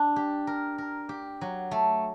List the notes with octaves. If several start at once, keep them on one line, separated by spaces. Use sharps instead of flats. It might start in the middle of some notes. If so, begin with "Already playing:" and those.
Already playing: D4
G4
A#4
A#4
G4
F#3
A3